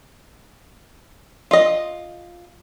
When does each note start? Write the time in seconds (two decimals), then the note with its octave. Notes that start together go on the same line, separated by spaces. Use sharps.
1.51 F4 D#5